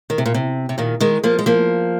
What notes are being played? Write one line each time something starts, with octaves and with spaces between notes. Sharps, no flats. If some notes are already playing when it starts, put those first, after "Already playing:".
D#3
C3
A#2
C3
C3
A#2 D#3
D#3 G#3
F3 A#3
G#3
F3 A#3